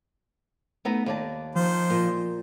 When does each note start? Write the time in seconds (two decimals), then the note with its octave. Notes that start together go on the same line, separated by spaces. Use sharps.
0.85 A3 B3 D#4
1.06 D#2 D5 A5
1.55 D#3 F3 C5
1.90 A#2